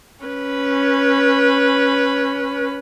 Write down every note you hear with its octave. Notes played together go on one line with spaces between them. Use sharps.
C#4 B4